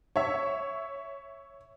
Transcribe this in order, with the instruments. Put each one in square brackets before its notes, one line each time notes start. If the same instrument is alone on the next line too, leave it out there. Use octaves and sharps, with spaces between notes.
[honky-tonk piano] C#5 E5